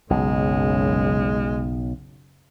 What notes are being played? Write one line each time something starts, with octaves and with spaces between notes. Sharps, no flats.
F#1 B1 C#3 G#3